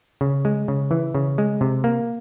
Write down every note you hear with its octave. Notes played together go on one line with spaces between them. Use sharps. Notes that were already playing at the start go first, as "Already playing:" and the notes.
C#3
G#3
C#3
E3
C#3
G#3
C3
A#3